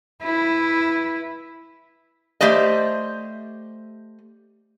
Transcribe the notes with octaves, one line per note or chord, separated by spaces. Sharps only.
E4 B4
A3 G4 C5 D5 D#5